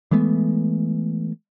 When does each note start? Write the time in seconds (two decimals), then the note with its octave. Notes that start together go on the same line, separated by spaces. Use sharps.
0.11 E3 G#3 A3 B3